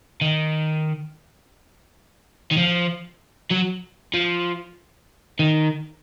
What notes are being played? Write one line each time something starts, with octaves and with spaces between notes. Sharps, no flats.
D#3
D#3
F3
F#3
F3
D#3